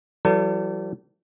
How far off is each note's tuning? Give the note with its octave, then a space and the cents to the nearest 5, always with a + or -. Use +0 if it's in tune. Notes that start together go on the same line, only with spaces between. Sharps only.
E3 +45 G3 -40 A4 +35